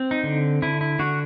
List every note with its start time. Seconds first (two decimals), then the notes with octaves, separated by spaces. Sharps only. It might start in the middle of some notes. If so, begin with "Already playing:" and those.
Already playing: C4
0.11 D#4
0.24 D3
0.62 D3 E4
0.81 E4
0.99 D3 F#4